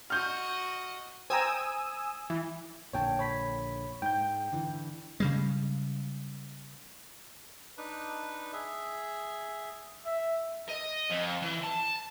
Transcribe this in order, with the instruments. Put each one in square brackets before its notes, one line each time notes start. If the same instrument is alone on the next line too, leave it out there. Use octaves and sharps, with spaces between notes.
[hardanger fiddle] F#4 D#5 [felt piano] F6 G6
[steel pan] C5 G5 A#5 [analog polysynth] G#5 D#6 E6
[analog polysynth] E3
[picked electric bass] A#1 A#2 D3 [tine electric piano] C#5 G5 A5
[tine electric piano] C#5 B5 B6
[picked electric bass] G#2 [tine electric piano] G5 G6
[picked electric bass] D3 E3
[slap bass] C#3 G3 G#3
[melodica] D4 D#4 B4
G#4 E5
[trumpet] E5
[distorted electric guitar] D#5
F2
E3
A5